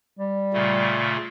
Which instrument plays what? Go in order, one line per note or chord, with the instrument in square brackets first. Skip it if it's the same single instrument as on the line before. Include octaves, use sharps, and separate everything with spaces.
[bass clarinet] G3
[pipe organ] A#2 C#3 A3